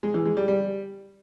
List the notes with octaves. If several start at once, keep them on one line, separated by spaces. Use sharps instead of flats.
G#3
E3
G#3
G3
G3